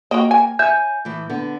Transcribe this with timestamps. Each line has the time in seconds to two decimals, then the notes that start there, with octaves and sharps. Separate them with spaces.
0.11 A#3 F#4 D#5 G5
0.31 G#5
0.59 C#5 E5 G#5 G6
1.05 A2 E3
1.30 D3 B3